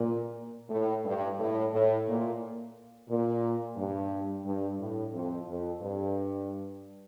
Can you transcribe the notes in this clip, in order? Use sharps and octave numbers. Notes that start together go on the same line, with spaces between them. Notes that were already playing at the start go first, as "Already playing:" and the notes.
Already playing: A#2
A2
G2
A2
A2
A#2
A#2
G2
G2
A2
F2
F2
G2